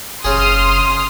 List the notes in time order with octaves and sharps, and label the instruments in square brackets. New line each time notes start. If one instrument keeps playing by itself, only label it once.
[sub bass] F#1 [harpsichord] C#3 G#4 [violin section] C6 D#6 F6